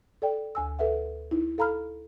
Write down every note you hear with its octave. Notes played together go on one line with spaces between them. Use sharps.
A4 D5 G5
D2 G#5 E6
A4 B4 E5 F#5
D#4 E4
A4 F5 A#5 B5 F6